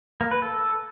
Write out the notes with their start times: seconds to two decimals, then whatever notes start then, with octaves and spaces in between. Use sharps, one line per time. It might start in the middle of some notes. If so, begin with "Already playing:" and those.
0.21 A#3
0.31 B4
0.42 A4